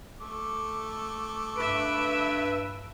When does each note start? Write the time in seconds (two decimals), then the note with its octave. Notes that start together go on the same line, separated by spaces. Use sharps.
0.21 A3 D6
1.57 G2 B4 E5 D7